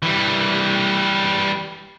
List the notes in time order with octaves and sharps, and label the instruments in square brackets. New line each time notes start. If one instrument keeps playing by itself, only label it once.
[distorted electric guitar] E3 G3